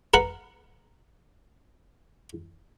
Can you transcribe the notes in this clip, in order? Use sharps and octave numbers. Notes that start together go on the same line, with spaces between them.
A#4 B4 F#5